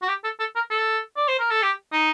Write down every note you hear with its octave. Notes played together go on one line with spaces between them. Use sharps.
F#4
G4
A4
A4
A#4
A4
D5
C5
A#4
A4
G4
D#4